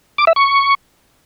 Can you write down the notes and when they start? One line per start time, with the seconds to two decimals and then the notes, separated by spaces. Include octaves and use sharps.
0.18 D6
0.27 E5
0.36 C#6